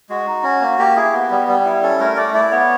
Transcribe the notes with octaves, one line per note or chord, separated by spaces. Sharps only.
G#3 F#4
D#4
C#4
A#3
A#3 G4
E4 G#4
B3
G3
G3
E4
C#4 A4
A3 A#4
A3 D5
E4 D5
B3 C#5